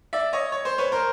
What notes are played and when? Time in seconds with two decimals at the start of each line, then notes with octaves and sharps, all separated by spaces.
0.13 D5 E5
0.33 C#5 D#5
0.52 C#5
0.65 C5
0.78 B4 C#5
0.92 A#4 C5